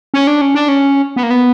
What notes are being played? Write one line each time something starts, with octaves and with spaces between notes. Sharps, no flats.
C#4
D4
C#4
D4
C#4
B3
A#3
B3